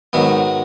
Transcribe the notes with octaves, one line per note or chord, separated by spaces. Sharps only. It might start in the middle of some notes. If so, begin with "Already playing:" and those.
G#2 D#3 F#3 B3